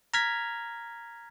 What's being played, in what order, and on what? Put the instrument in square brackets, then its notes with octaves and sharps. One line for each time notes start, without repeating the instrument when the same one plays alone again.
[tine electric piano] A#5 F6 G#6 B6